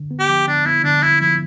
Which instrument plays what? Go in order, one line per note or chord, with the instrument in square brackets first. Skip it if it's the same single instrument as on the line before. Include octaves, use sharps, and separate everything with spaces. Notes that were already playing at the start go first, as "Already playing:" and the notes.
Already playing: [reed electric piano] D3
B3
[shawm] G4
[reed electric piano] F3
[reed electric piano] D3 [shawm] D4
[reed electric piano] B3 [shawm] E4
[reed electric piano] D3 [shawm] D4
[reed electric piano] D3 [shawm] E4
[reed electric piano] F3 [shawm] E4